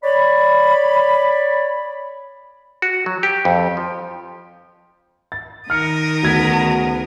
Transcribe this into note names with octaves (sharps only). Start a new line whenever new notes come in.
C#5 D5 B5
F#4
F#3
G4
F2
F3
A6
D#3 A#4 D#6 F6 C#7
D2 C#3 B3 F#4 G#6 B6